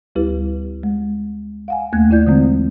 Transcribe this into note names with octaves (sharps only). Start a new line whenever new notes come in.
D2 G3 E4 G4 B4
G#3
F5 F#5 G#5
D#2 A3 A#3 F#6 G#6
D#2 E4 F4 D5 G6
D3 E3 G#3 C4